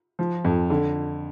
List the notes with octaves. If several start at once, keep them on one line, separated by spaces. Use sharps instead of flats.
F3
F2
D3